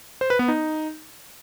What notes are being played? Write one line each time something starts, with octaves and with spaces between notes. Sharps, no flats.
C5
B4
B3
D#4